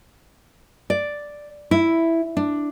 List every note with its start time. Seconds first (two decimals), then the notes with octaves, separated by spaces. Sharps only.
0.90 D5
1.71 E4
2.37 D4